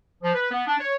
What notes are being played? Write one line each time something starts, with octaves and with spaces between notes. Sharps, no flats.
F3
B4
B3
D4
C#5